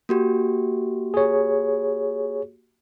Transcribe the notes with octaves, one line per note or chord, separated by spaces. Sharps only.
A#3 F#4 G4
G#4 C#5